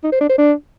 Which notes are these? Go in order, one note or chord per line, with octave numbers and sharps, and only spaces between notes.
D#4
C5
D4
C5
D4